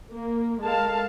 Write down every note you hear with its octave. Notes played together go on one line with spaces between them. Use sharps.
A#3
G#3 A4 A#4 F5 A5